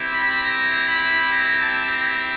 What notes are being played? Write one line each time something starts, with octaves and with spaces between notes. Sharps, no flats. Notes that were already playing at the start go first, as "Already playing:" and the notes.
Already playing: C4 E4 G4
B5
A#5
B5
A#5
A5
A#5